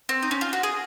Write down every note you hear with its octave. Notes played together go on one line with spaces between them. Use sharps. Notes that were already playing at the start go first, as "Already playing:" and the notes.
C4
D#4
C#4
F4
F#4
G#4